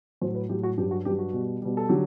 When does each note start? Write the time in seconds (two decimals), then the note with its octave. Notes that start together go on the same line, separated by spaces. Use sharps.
0.21 A2 F#3 C5
0.35 B4
0.49 A2 F#3 G4
0.63 F#4
0.78 G2 F#3 G4
0.91 F#4
1.05 G2 F#3 G4
1.19 F#4
1.33 B2 G3
1.62 B2 G3
1.77 A4
1.89 D3 F#3 G4